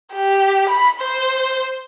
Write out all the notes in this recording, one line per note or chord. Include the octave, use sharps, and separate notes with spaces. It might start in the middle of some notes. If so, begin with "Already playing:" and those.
G4
B5
C5